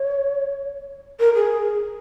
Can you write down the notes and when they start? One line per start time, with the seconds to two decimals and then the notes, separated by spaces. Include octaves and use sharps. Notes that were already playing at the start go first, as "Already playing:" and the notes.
Already playing: C#5
1.20 A#4
1.35 G#4